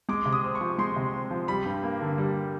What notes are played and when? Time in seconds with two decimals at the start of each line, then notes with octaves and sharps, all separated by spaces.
0.09 G#3 D6
0.26 C3
0.32 D#6
0.44 C4
0.55 C#6
0.61 F3
0.78 G#3 C6
0.96 C3
1.13 C4
1.31 F3
1.48 G3 B5
1.66 G2
1.83 A#3
2.01 D3
2.18 G3